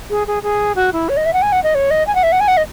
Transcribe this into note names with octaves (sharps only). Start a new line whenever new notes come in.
G#4
G#4
G#4
F#4
E4
C#5
D#5
E5
F#5
G#5
F#5
D#5
C#5
D#5
G#5
F#5
E5
F#5
G#5
F#5
D#5